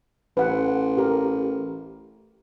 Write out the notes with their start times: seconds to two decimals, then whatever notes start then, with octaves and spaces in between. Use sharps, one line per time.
0.37 A1 B4 F#5
0.97 G4 A#4